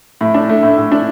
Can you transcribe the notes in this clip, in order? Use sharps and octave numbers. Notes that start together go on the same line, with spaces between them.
A2
D4
A3
A2
A2
D4